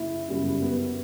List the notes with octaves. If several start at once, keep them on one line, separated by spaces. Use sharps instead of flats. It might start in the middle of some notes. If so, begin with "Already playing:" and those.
Already playing: F#1 C#3 E4
G1 F#2 C#3 G3
B3